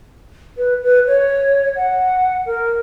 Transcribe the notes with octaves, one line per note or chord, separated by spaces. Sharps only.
B4
B4
C#5
F#5
A#4